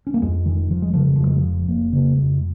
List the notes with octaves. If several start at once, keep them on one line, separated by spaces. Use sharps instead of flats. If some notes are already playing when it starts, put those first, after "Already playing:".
C#4
A#3
F2 G#3
F1 D#3
F1 F3
G#3
C#3 F3
G#3
F2 F3
G#3
F1 F3
F1 A#3
C#3 A#3
F2 G#3